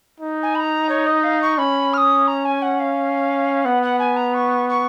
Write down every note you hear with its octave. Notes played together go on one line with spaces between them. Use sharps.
D#4
G#5
B5
A#5
C#5
D#5
F5
C#6
C#4 B5
F6
D#6
A#5
G#5
F#5
F5
B3 F#5
F#5
G#5
A#5
C#6
C#6